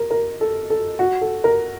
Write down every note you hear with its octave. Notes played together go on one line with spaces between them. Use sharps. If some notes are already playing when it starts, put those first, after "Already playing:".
Already playing: A#4
A#4
A4
A4
F#4
A4
A#4